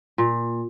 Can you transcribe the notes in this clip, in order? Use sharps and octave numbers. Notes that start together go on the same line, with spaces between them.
A#2